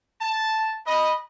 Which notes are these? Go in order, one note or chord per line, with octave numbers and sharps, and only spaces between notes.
A5
D#5 B5